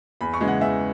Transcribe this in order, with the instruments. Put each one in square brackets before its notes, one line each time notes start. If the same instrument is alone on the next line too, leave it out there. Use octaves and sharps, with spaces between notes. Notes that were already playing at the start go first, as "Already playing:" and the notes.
[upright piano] E2 B5
C#6
C#3 E3 G#3
F#5
E2 E5